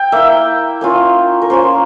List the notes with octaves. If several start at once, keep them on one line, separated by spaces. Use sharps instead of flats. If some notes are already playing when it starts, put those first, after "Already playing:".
Already playing: G5
A#3 E4 E5
A#3 C#4 F4
A#4
A#3 C#4 F4 C5